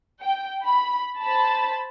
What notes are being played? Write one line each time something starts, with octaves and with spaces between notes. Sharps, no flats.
G5
B5
C5 A5 B5